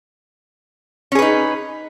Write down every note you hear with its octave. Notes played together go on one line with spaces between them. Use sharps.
C#4 D#4 G#4 B4